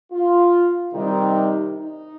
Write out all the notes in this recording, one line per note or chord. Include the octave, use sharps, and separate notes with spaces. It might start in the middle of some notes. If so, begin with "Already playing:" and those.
F4
C3 D#3 G3 D#4
D#4